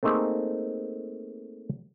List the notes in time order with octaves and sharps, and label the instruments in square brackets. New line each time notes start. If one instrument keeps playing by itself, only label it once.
[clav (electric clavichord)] A3 A#3 C4 D#4 G#4